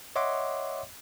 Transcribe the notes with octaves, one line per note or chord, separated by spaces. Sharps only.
C#5 D#5 E5 F#5 C6 D6